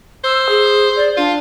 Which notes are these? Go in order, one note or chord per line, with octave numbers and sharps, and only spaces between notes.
C5 E6
G#4
D5
D4 F4